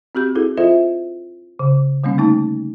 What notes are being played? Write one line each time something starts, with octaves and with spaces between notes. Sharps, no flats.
C4 F#4 G4 G6
E4 F#4 G#4 A4
F4 A4 C5 D#5 E5
C#3
D3 G3 A#3 C#4
A3 D#4 A5